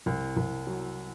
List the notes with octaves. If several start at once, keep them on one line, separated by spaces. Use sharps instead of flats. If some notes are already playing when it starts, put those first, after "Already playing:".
C2
C2
F#3